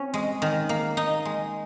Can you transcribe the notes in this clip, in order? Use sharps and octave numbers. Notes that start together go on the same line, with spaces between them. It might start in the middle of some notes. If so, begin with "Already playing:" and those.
Already playing: C4 C#4
G#3
D#3
A#3
D#4
G#3